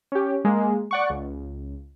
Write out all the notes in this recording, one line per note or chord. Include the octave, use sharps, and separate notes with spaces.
C#4 G4
G#3 A#3
D5 F#5 C#6
C#2